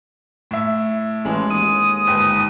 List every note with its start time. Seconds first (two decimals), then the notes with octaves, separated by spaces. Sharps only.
0.51 A2 E5
1.25 A1 G#3
1.50 D#2 D#6
2.07 G1 G#2 G5